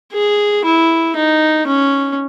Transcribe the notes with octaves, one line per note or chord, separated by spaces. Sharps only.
G#4
E4
D#4
C#4